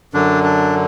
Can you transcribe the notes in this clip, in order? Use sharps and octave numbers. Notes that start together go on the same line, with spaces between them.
F#2 D3 D4
D4